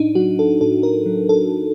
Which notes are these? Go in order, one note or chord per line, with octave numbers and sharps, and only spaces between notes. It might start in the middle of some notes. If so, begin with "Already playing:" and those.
Already playing: A2 D4 D#4
F#3 F#4
A4
A2 A4
A#4
F#3
A4